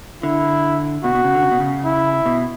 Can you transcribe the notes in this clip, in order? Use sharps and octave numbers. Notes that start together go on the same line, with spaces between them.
D3 E4
B2 F#4
B2
C#3
D3
C#3
B2
C#3
E4
B2